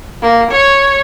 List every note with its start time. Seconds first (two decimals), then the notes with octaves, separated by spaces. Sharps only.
0.22 A#3
0.51 C#5